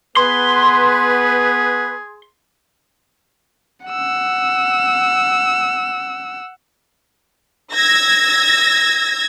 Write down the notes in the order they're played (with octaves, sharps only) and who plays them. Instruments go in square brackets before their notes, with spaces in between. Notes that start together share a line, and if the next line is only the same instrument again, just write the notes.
[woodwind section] B3 B4 [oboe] G#4 [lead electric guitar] C6
[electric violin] F#5 E6
[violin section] E6 G#6 A#6